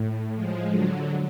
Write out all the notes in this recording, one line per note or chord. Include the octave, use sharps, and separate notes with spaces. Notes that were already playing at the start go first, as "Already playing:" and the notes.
Already playing: A2
F3 G#3
D3 F#3